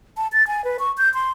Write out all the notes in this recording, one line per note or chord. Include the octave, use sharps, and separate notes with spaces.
A5
A6
G#5
B4
C#6
G6
C6